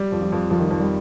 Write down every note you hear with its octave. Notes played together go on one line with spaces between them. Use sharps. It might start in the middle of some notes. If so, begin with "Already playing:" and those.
Already playing: G3
F2
F3
F2
F2 F3
D#3
F3
F2
G3